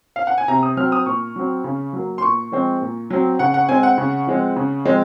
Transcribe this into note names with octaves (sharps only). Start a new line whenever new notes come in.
F5
F#5
G#5
C3 A#5
D#6
F#3 C4 F6
D#6
A#2 C#6
F#3 C4
C#3
F#3 A#3
C6
A#2 C#6
F3 G#3 C4
A#2
F#3 C4
C#3 F#5
F#5
G#3 C4 G#5
F#5
C#3
F3 G#3 C4
C#3
F3 G#3 C4